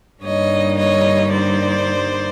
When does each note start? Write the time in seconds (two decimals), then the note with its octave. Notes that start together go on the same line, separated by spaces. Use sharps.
0.23 G2 D3 G3 A#3 D#4 C#5 D#5
0.77 C#5 D#5
1.32 C5 D5